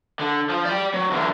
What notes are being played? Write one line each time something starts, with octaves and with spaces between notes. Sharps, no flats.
D3
F3
D5 G5
F#3
E2 D3